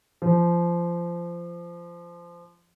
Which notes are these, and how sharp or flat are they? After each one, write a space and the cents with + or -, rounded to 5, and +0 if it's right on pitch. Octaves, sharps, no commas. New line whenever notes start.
F3 -20